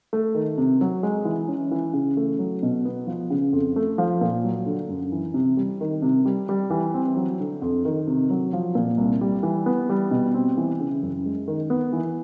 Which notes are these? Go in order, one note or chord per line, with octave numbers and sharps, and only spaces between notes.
A3
D#3
C3
F#3
G#3
E3
C#4
E3
C#3
A3
F#3
B2
B3
F3
C#3
F2
A3
F3
A#2
F#3
D3
F#2
E3
C3
G3
D#3
C3
G3
G3
E3
C4
F#3
D3
F2
D#3
C3
F#3
F3
A#2
C2
G3
E3
B3
G3
B2
C4
E3
C#3
F#2
G#3
D#3
B3
E3